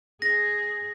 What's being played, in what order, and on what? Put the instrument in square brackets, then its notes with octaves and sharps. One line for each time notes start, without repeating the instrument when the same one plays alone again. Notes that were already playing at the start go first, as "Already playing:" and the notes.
[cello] G#4 [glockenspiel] A#6